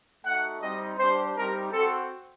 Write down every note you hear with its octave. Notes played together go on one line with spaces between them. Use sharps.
A3 D#4 F#4 F#5
G3 C4 D#4 D#5
G3 D4 G4 C5
G3 C4 D#4 G4 A#4
C4 F#4 A4